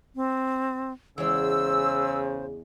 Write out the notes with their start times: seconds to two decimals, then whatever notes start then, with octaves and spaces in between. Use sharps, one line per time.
0.16 C4
1.18 E2 C#3 G#3 C5 E6